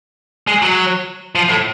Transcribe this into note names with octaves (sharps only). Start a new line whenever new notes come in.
G#3
F#3
F3
A2